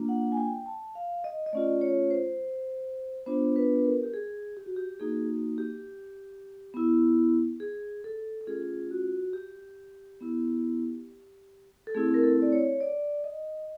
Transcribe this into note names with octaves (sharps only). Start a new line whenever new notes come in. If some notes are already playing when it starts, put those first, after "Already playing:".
Already playing: A#3 D4 F4
F#5
G#5
G5
A5
F5
D#5
D#5
A3 C#4 F4 D5
C#5
C5
B3 D4 F4 C5
B4
B4
A#4
G4
G#4
G4
F#4
G4
A#3 D#4 F#4 G#4
G4
B3 E4
G#4
A4
A4
A3 C#4 F4 G#4
F#4
G4
B3 E4
A4
A3 C4 E4 G#4
A#4
A4
D5
C#5
D5
D#5